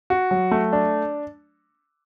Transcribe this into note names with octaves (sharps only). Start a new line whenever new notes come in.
F#4
F#3
A3
D4